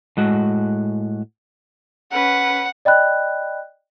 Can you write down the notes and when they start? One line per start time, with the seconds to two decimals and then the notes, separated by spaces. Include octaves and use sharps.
0.17 A2 G#3 F#4
2.12 C#4 B4 F#5
2.85 D5 D#5 G5 B5 F#6